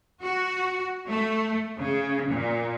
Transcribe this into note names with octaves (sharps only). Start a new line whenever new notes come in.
F#4
A3
C#3
A#2